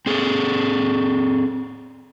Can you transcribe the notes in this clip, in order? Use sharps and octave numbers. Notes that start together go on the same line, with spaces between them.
C4 G#4 A4